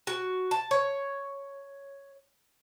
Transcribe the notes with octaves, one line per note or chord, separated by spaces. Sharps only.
F#4
A5
C#5